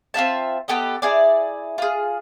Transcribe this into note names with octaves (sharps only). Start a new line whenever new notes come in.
C4 F4 E5 A5
B3 G4 A4 D#5
E4 G#4 D5
F4 G#4